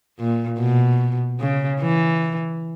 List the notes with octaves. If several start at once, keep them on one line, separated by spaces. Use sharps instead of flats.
A#2
B2
C#3
E3